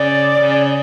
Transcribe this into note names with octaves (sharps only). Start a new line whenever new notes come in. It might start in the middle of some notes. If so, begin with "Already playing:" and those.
Already playing: C#3 D5
C#3